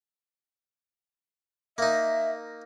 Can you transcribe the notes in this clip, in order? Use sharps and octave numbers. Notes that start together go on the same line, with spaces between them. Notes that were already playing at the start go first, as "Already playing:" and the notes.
A#3 D#4 E5